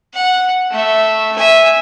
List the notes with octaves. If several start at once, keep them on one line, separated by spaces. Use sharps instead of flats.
F#5
A3 E5
E5 G#5